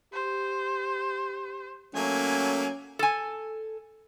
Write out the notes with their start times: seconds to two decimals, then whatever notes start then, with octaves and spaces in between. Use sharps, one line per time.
0.13 G4 C5
1.95 F#3 A3 A#3 C#4 G#5
2.99 A4 G#5